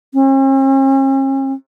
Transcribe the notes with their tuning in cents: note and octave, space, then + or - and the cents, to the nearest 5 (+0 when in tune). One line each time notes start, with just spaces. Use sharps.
C#4 -45